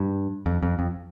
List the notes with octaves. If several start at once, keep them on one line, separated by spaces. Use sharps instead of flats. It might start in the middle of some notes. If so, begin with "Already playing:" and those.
Already playing: G2
F2
F2
F2